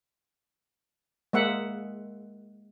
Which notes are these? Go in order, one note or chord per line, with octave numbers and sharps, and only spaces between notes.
G#3 A#3 E5 F#5